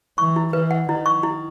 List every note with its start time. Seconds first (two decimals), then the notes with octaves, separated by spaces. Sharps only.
0.18 E3 C#6
0.36 E4
0.53 E3 B4
0.71 F#5
0.88 D#3 E4
1.06 C#6
1.23 E4